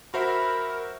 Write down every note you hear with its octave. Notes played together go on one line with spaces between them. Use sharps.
F#4 A#4 C5 E5 B5